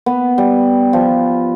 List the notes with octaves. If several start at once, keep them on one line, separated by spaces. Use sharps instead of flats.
B3
G3
F3